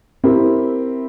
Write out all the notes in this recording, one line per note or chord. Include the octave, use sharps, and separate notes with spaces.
C4 E4 G4 A#4